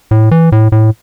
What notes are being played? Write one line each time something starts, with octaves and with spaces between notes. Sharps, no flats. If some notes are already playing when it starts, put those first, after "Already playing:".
A2
E3
A2
A2